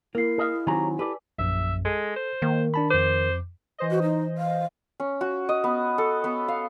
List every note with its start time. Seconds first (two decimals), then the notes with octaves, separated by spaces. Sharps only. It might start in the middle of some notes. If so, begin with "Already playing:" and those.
0.15 A#3 E4 A#4 C7
0.38 G#4 D#5 F5
0.67 D#3 F#3 C4 G4 C#5 G#5 A#5
0.99 G4 A4 B4 D5
1.38 A#1 F#2 E5
1.85 G#3 A4
2.16 C5
2.42 D#3 A#3
2.74 D4 A5 B5
2.90 F2 C5 D6
3.78 E3 C5 D#5
3.91 F#4
4.02 D#4
4.38 F5
5.00 C#4
5.21 F#4
5.49 D#5
5.64 B3
5.98 A4
6.24 B3
6.48 F5